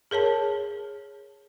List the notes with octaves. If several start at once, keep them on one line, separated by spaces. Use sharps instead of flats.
G#4 A#4 C#5 A5